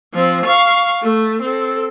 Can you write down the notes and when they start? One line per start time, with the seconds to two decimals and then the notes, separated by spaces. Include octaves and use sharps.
0.14 F3 C4
0.45 F5 C#6
1.02 A3
1.41 C4 A4